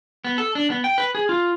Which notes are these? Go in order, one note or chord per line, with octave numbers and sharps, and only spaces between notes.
B3
A4
D4
B3
G5
B4
G#4
F4